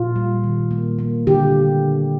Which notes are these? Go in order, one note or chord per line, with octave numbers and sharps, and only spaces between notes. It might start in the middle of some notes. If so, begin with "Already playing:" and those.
Already playing: A#2 F4
G3
D#3
A#3
A#3
D3 G4